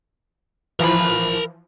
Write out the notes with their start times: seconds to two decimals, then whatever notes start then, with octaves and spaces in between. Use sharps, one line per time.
0.80 E3 F3 A#4 B5